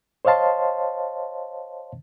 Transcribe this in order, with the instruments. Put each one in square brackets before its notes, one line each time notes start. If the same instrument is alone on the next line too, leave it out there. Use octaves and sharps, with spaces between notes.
[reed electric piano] C5 C#5 D#5 F5 A5 C6